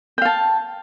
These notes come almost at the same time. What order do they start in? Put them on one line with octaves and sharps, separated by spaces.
G5 F5 A5